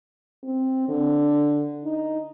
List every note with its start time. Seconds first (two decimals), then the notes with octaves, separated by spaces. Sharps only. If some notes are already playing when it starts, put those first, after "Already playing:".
0.43 C4
0.88 D3
1.84 D#4